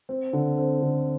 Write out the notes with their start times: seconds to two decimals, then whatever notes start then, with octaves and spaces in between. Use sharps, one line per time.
0.09 C4
0.33 D3
0.58 C4
0.82 D3